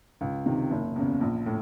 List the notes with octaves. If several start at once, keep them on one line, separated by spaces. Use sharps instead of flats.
C#2
C3 D#3
F#1
E2 C#3
A#1
A2